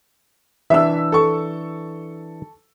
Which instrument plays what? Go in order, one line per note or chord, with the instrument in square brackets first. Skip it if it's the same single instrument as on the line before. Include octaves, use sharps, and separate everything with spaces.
[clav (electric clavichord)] E3 D4 [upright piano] E5 E6
[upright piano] A4 C#6